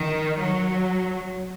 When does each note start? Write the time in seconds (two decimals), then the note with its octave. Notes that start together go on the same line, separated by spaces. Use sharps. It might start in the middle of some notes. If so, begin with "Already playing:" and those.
Already playing: D#3
0.37 F#3